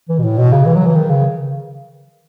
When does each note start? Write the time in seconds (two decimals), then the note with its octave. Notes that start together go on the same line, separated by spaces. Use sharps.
0.09 E3
0.19 B2
0.24 A2
0.38 B2
0.52 C#3
0.66 E3
0.76 F#3
0.86 E3
0.95 D#3
1.10 C#3